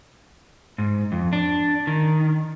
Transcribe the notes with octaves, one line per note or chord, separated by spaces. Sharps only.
G#2
F2
D4
D#3